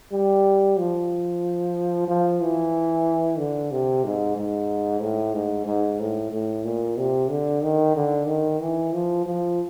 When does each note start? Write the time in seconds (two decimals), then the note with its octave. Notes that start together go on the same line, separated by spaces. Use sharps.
0.12 G3
0.79 F3
2.08 F3
2.41 E3
3.38 D3
3.71 C3
4.04 G#2
4.37 G#2
5.01 A2
5.34 G#2
5.66 G#2
6.00 A2
6.32 A2
6.65 A#2
6.98 C3
7.30 D3
7.62 D#3
7.95 D3
8.27 D#3
8.59 E3
8.93 F3
9.26 F3